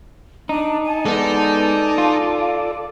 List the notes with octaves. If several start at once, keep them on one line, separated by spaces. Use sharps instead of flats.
D4 D#4
G#5 A5
G#3 B3 D#4 A4 D5
F4